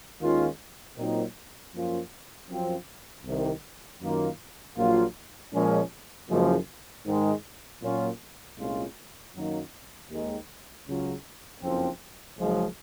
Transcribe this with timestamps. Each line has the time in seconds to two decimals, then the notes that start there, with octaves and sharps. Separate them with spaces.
0.21 D#2 D#3 G#3 C#4 F4
0.97 A#2 F#3 C4 D#4
1.74 F#2 F3 A#3 C#4 F4
2.49 F#2 F3 C4 F4
3.25 C2 C3 D#3
4.01 F#2 D#3 A#3 F4
4.78 A#1 A#2 F#3 A#3 F4
5.54 A#2 F3 G#3 C#4
6.30 F#1 F#2 F3 G#3
7.06 G#2 D#3 G#3
7.82 A#2 F#3 C#4 F4
8.58 C2 A#2 G#3 C#4 F4
9.35 F#2 D#3 F#3 A#3 D#4
10.10 D#2 D#3 G#3
10.86 C#2 C#3 F#3 C#4 F4
11.62 F#1 F2 C#3 F3 C4
12.38 F#1 F#2 F3 G#3